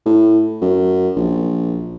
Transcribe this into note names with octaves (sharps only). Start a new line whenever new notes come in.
A2
F#2
A#1